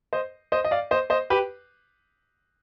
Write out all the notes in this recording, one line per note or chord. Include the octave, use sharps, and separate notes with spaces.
C5 D#5
C5 D#5
D#5
D5 F5
C5 D#5
C5 D#5
G4 B4